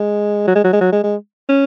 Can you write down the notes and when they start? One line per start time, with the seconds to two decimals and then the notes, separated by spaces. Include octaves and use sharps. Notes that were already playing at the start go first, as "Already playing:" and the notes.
Already playing: G#3
0.47 F#3
0.55 G#3
0.64 F#3
0.73 G#3
0.81 F#3
0.92 G#3
1.04 G#3
1.49 C#4